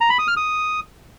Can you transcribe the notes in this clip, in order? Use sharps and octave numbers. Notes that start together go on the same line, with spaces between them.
A#5
B5
D#6
F6
D#6